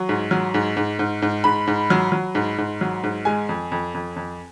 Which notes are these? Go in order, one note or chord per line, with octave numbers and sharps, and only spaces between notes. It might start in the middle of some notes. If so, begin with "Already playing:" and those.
Already playing: F#3 C#6
G#2
F#3
G#2
G#2
G#2
G#2
G#2 B5
G#2
F#3
F#3
G#2
G#2
F#3
G#2
G#3 G#5
F2
F2
F2
F2